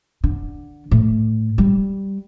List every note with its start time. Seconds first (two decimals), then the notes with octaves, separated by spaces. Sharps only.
0.24 D3
0.91 A2
1.58 G3